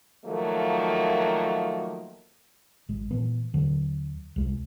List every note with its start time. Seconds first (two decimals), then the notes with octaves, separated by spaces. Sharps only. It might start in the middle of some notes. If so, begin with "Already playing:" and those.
0.25 D#3 F3 F#3 A3 A#3
2.89 G#1 G#3
3.11 A#2 E3 A#3 B3
3.53 D#2 D3 F#3
4.36 C2 G#3